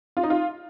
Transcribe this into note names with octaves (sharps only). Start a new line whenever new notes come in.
F4
D#4
F4